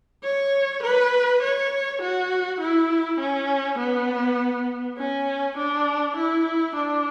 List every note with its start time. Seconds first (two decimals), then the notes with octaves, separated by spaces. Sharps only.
0.24 C#5
0.83 B4
1.42 C#5
2.02 F#4
2.60 E4
3.20 C#4
3.79 B3
4.98 C#4
5.57 D4
6.17 E4
6.75 D4